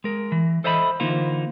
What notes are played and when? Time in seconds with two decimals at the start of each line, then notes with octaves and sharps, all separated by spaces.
0.04 G#3 A#4
0.32 E3
0.64 A4 C5 D#5 E5 A#5 B5
1.00 D3 E3 A#3 D#4 F4 C5